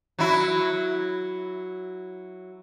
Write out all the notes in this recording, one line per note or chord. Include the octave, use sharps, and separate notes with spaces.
F#3 E4 F#4